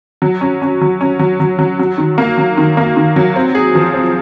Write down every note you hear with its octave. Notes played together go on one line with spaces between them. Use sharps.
F#3
C#4
C#4
F#3
C#4
F#3
F#3
F#3
F#3
D#3
A#3
F#3
D#3
A#3
D#3
F#3
C4
G#4
F3
C4